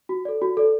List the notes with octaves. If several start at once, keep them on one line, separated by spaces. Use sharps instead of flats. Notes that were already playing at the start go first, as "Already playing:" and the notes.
F#4
A4 D5
F#4
A4 D5